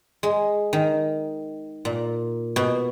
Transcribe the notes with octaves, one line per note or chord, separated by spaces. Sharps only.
G#3
D#3
A#2
B2